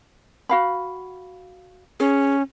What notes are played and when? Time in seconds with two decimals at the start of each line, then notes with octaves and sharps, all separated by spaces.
0.49 F#4 F5 B5
2.00 C#4 G#4